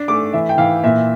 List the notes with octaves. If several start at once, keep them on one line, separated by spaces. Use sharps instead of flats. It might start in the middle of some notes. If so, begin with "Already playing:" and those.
Already playing: D4
A3 D6
E3 E5
G5
E3 F5
A#2 E5